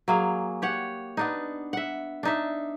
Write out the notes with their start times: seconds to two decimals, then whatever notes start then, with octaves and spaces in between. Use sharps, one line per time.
0.08 F#3 A#3 G#4
0.62 G4 C#5 F#5
1.17 B3 D4 D#4
1.73 E5 F#5
2.23 D4 D#4 E5